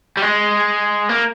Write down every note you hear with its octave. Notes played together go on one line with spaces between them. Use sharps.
G3
G#3
A#3